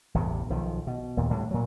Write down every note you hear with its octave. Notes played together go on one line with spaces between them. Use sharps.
A1 E2 G2 C3
B1 D#3 F3
B2
D#2 A#2
D2 A2 G3
A#2 F#3